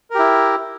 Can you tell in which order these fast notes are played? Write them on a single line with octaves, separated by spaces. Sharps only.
A#4 G4 E4